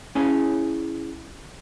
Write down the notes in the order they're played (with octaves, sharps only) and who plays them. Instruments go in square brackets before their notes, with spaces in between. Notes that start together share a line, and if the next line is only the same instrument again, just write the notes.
[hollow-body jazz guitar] C#4 E4 G#4 C#5 G#5